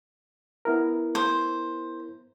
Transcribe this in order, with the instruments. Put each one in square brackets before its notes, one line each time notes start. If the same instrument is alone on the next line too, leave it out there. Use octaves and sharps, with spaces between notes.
[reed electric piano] B3 E4 A#4
[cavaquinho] C5